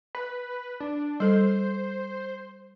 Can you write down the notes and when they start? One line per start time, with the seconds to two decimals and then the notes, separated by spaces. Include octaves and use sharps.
0.15 B4
0.80 D4
1.20 G3 A4 C5